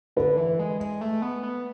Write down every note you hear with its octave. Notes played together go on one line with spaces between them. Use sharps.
D3 B4
E3
G#3
G#3
A3
B3
B3